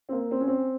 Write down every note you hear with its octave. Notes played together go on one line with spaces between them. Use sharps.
C4
A#3
C4
C#4
C4